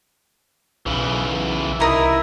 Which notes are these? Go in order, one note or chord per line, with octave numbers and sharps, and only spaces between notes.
B1 C#3 E3
C2 D#4 E4 A#4 D#6